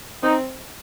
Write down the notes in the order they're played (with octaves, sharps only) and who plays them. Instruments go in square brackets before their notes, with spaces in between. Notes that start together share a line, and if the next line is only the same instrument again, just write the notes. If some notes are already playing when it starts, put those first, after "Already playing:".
[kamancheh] C4 [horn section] D#4